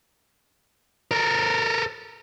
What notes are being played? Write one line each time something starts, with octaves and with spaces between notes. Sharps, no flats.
A4 A#4